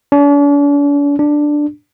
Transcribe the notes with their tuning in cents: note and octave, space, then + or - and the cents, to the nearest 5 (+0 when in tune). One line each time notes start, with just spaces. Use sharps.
D4 -45
D4 +5